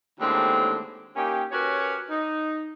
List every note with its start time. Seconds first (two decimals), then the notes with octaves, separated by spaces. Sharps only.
0.20 D#2 A2 D3 G#3 C4 D4
1.16 A#3 C#4 D#4 G4
1.52 C#4 F#4 G4 A#4 B4 C#5
2.10 D#4